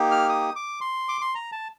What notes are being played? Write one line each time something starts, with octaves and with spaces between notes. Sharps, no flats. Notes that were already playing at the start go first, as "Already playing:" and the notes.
Already playing: A#3 D#4 G4
F6
D#6
D6
C6
D6
C6
A#5
A5